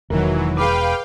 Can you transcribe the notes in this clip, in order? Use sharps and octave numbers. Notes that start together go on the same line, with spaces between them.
E1 D#3 E3 F#3 E4 A#4
G#4 B4 F5 G5 D6